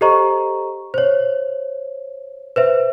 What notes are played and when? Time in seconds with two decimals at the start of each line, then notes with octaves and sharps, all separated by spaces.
0.01 G4 A4 C5 D#5 A#5 C#6
0.94 C5 C#5
2.56 B4 C5 E5